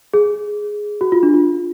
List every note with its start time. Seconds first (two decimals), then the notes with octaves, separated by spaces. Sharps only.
0.14 G#4
1.01 F#4
1.12 F4
1.23 D4
1.34 F4